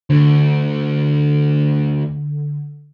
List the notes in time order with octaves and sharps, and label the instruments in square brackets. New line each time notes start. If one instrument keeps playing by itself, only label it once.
[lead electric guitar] D2 [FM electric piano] D3